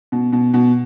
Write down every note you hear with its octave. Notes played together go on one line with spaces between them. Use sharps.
B2
B2
B2